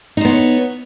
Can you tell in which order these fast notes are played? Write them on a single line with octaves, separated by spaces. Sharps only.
D#4 C5 B3 C#5